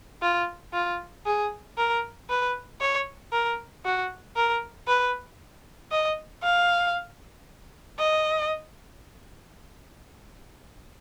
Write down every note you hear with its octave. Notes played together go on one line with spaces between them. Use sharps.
F4
F4
G#4
A#4
B4
C#5
A#4
F#4
A#4
B4
D#5
F5
D#5